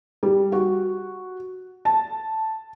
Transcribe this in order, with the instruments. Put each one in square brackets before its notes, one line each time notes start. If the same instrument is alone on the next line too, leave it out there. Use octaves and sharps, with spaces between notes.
[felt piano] G3
F#4
A5